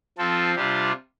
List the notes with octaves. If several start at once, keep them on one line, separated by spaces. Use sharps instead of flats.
F3 C4 F4 A4
C3 G3 D4 F4 G4